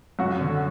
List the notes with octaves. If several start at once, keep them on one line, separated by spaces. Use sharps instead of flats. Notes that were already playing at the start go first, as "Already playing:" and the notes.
F#2 F#4
D3